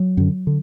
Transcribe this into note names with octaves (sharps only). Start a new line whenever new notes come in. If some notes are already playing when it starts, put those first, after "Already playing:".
Already playing: F#3
F#2 D3
D3